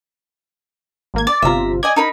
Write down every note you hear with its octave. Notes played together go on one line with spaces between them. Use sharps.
G#1 A#3 G#6
D5 A6
G1 C3 F4 E5 A#5
D5 D#5 G#5 G#6
D#4 A#4 B5